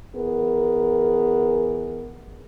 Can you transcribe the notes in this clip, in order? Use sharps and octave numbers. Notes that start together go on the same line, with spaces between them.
E3 B3 G#4 A#4